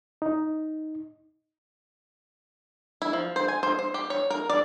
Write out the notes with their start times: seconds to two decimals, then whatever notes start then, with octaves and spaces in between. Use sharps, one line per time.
0.22 D#4
3.02 E4
3.13 F3
3.36 C5
3.48 G#5
3.63 C5
3.79 C5
3.94 G4
4.10 C#5
4.30 A#4
4.49 D5